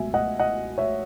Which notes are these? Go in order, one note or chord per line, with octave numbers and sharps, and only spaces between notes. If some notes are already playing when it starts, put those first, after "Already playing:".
Already playing: C#2 B2 F#3 E5 G#5
D#5 F#5
D#5 F#5
C#5 E5